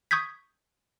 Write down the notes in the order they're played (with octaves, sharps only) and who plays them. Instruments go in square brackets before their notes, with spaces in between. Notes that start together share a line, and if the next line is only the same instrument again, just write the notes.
[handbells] C#6 D#6 G6 G#6 B6